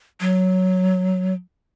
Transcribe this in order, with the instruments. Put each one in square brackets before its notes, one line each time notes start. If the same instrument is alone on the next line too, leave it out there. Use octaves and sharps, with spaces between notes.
[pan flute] F#3